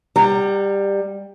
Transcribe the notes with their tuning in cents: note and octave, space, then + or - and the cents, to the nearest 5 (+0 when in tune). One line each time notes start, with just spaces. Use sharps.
G3 +15 G5 -45 A#5 -20